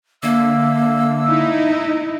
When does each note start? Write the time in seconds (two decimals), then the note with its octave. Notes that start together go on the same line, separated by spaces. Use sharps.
0.23 D3 A#3 E5 E6
1.26 D#4 E4